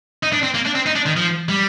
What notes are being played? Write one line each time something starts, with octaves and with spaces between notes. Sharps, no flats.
D#4
D4
C4
A#3
D4
C4
D#4
D4
D#3
F3
G3